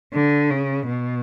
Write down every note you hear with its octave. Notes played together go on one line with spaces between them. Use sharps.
D3
C#3
B2